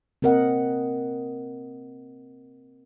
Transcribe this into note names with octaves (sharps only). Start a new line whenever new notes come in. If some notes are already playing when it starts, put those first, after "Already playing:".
A#3 C4 A#4 D#5 F#5